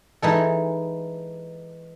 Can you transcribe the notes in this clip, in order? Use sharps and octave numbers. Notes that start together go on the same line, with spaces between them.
E3 G#3 D#4 A4